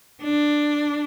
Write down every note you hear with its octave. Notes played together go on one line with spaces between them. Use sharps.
D4